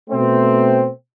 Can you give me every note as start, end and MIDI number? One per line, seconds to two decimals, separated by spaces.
0.10 0.89 47
0.10 0.89 57
0.10 0.89 60